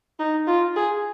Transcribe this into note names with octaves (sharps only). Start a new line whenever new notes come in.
D#4
F4
G#4